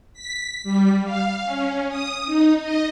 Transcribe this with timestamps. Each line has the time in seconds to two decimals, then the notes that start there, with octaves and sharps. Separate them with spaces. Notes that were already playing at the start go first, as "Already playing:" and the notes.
0.13 B6
0.64 G3
1.04 F5
1.45 C#4
1.89 D#6
2.26 D#4
2.60 D#5